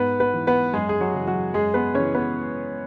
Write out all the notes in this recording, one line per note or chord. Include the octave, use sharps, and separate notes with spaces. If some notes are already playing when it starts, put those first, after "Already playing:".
Already playing: G#2 B3 B4
B3 B4
E3
B3 B4
F#2 G#3 G#4
G#4
F#3 F#4
C#3 E3
F#3 F#4
F#2 G#3 G#4
B3 B4
C#3 E3 C#4 C#5
B3 B4